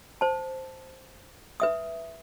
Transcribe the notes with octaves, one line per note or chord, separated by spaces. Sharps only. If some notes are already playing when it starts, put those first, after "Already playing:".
C5 A5
B4 E5 D#6